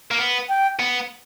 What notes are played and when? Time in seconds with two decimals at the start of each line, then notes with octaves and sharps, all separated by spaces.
0.11 A#3
0.19 B3
0.49 G5
0.80 B3